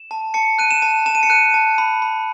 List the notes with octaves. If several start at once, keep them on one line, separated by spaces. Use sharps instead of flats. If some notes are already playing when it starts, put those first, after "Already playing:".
Already playing: E7
A5
A5 C#7
F#6 D#7
E7
A5
A5 E7
D#7
C#7
F#6 D#7
A5
B5
B5